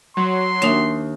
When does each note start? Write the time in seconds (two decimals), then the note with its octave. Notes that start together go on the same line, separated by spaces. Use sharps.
0.17 F#3 C6
0.62 D#2 D4 D#4 E5